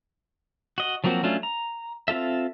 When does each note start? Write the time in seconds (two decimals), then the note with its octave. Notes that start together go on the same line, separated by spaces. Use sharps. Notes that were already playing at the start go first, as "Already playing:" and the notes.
0.78 F#4 D#5
1.04 F3 F#3 A#3 C4 F#4
1.23 F#3 A3 C#4 D4 F4
1.43 A#5
2.08 C4 F4 A4 E5